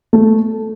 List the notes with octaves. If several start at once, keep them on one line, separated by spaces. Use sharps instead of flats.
A3